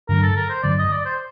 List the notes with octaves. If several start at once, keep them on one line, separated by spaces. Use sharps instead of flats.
G2 D3 F#3 A#4
A4
A#4
C5
G2 D3 F#3 D5
D#5
D5
C5